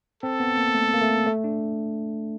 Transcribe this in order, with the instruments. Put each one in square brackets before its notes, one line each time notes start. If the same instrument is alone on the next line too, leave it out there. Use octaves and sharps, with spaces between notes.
[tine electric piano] C4 [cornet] A4
[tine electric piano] B3
A#3
A3
A#3
A3
A3
D4